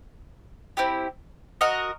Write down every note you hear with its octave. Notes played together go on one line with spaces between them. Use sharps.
C4 E4 G4
F#4 A#4 D#5 F#5